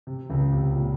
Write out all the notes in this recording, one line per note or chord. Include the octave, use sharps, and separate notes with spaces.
C3
C#2 C#3
C3
A#2